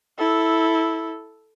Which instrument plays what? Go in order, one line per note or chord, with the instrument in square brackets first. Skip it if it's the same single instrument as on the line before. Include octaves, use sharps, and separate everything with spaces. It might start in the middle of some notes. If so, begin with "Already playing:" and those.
[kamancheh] E4 A4